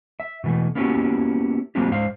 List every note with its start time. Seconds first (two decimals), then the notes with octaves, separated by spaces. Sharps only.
0.20 E5
0.44 B2 E3 A3
0.75 A#3 B3 C#4 E4 F#4 G4
1.75 F#3 A#3 C4 D4 F4 G4
1.91 G#2 C5 F5